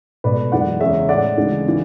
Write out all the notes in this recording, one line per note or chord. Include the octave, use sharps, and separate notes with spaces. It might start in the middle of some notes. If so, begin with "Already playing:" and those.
C#2 B2 A3 B4 D5
F#2 E3 G#3 D5 F#5
E2 C#3 G#3 C#5 E5
A2 G#3 D5 F#5
D2 C#3 E3 G#3
C#3 E3